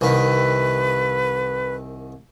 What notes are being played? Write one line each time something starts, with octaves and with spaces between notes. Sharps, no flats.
C2 D#3 B4